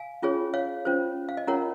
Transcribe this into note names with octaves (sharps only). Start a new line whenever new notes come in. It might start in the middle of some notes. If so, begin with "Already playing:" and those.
Already playing: F5 G#5
C#4 F4 G#4 C#5
C#5 F5
C#4 F4 C5
F5
D#5
C#4 F4 A#4 C#5 F#5 A#5